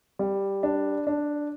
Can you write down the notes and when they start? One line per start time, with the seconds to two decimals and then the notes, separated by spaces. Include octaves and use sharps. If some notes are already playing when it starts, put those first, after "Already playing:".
0.19 G3
0.63 D4
1.07 D4